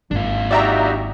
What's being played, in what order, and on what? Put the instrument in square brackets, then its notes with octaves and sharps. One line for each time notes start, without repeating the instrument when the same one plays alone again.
[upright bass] G#1 A#3 [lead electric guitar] D4 F4
[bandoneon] D#4 F#4 G4 [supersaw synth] D5 E5 A#5